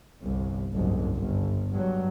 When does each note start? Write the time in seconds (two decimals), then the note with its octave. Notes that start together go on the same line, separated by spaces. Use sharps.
0.21 G1 C2
0.74 F#1 C2 G#2
1.15 G1
1.72 G2 F#3